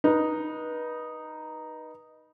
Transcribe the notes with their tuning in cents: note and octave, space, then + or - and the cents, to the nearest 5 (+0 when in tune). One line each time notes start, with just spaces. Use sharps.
D#4 -5 B4 -30